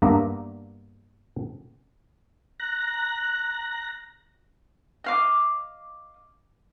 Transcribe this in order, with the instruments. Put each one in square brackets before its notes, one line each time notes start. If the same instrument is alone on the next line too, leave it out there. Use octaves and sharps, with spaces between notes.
[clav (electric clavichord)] G2 A#3 B3 D4 E5 A#5
[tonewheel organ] A#5 F#6 A#6
[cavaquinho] D#5 F5 D6